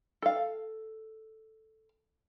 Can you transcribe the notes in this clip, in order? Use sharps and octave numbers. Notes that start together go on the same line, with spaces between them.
A4 F5